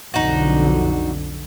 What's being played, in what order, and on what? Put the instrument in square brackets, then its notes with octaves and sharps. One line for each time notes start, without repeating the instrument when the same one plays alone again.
[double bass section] B1 F2 D3 [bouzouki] D#4 F#4